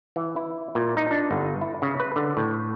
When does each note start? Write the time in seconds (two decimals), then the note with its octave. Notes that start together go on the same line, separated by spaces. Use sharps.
0.16 E3
0.36 E4
0.75 A#2
0.97 D#4
1.11 D4
1.31 G1
1.61 E4
1.82 C#3
2.00 B4
2.16 D3
2.37 A2